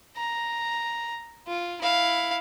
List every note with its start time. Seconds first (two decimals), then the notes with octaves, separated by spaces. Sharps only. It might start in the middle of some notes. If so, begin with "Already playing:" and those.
0.17 A#5
1.47 F4
1.81 E4 F5